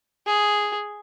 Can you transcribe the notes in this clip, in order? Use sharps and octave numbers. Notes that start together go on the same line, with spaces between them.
G#4